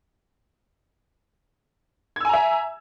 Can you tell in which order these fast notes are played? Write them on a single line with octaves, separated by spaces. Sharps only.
G#6 E6 G#5 A#5 E5